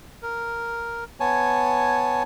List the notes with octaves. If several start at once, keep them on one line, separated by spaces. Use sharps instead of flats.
A#4
B3 C#5 G#5 A5